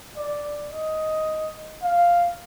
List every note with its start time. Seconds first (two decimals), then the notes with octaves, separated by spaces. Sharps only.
0.16 D5
0.72 D#5
1.83 F5